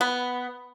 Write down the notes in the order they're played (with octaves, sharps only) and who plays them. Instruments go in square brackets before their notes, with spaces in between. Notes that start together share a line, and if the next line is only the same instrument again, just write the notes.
[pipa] B3